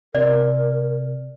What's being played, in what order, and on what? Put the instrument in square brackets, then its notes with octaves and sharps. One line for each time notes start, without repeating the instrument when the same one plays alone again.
[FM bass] C3 [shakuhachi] A#4 [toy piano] D5